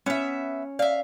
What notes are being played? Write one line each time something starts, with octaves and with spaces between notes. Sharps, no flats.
B3 C#4 E5
D5 E5 F5